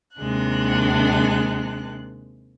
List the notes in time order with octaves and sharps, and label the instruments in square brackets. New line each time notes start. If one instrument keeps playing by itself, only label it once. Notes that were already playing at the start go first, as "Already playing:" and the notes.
[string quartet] D#2 C3 G#3 D4 F#6